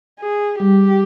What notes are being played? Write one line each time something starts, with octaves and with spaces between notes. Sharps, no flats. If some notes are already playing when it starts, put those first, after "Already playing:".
G#4
G3 G4